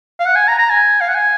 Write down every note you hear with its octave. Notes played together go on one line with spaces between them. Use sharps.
F5
F#5
G#5
A#5
A#5
G#5
F5
F#5
G#5